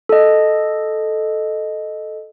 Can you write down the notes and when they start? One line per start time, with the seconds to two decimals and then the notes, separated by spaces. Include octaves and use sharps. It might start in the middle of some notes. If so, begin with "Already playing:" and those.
0.09 A4 D#5